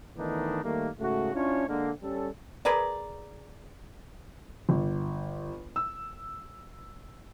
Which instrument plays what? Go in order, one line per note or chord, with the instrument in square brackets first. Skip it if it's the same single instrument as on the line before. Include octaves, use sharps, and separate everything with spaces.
[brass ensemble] D#3 E3 A3 B3 D4 D#4
D#3 G3 A3 A#3
G#2 C#3 A3 F#4
C#4 D4 E4 F4 C#5
D3 G#3 A#3
G3 C#4 A4
[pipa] G#4 A#4 B4 D5
[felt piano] G1
E6